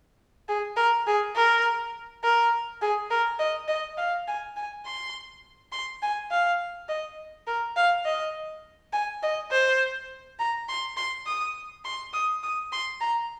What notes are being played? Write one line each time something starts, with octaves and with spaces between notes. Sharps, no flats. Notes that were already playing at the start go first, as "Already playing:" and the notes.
G#4
A#4
G#4
A#4
A#4
G#4
A#4
D#5
D#5
F5
G#5
G#5
C6
C6
G#5
F5
D#5
A#4
F5
D#5
G#5
D#5
C5
A#5
C6
C6
D#6
C6
D#6
D#6
C6
A#5